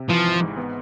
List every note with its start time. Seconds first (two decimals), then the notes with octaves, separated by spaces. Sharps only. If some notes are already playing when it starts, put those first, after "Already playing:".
Already playing: C3
0.09 E3 F3
0.25 G#1
0.41 G#2
0.57 B3